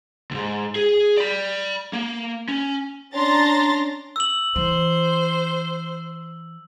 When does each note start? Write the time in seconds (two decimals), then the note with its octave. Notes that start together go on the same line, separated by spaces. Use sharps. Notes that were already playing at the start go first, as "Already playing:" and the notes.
0.31 D2 G#2
0.76 G#4
1.17 D5 B5
1.93 A#3
2.49 C#4
3.15 C#4 D4 A#5 C6 A6 A#6
4.16 E6 F#7
4.56 E3 C5